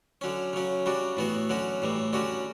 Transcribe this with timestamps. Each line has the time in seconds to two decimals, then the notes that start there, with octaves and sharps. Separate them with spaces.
0.21 D3 F#3 C#4
0.53 C#3 F#3 C#4
0.86 C#3 G3 D4 F#4
1.17 A2 E3 B3 F#4
1.50 D3 F#3 C#4 F#4
1.82 A2 E3 G3
2.13 D3 G3 C#4 F#4